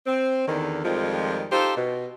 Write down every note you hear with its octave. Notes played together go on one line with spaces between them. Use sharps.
C4
E2 D3 D#3
F2 D#3 F3 G3 G#3
D#4 F4 G4 A4 C5
B2